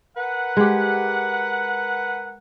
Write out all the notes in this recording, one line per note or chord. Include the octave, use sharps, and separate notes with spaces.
A#4 B4 F#5
G#3 G4